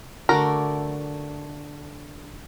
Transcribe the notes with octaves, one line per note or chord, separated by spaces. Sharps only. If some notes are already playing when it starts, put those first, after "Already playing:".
D3 A3 F#4 A#4 D5